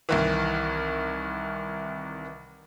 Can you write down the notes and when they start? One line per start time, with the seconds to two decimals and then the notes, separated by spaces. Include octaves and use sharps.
0.09 C2 D#3 E3